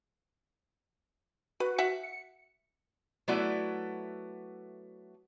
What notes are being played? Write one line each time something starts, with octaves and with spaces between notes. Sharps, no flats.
F#4 B4
E5 F#5
C#7
F#3 A3 B3 E4 F#4 D5